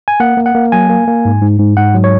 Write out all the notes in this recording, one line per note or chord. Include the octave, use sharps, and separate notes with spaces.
G#5
A#3 F#5
A#3
F#5
A#3
F#3 G#5
A#3
A#3
G#2
G#2
G#2
G#2 F#5
F#3
C#5